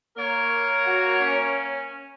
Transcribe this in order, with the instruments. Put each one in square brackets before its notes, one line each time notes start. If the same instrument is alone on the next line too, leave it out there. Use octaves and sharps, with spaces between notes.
[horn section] A#3 A#4 C#5
[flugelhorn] F#4
C#4